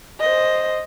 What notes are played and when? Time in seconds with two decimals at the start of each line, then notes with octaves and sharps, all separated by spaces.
0.20 C5 D#5